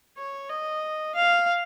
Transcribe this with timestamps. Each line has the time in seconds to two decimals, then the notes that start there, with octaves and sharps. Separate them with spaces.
0.17 C#5
0.50 D#5
1.15 F5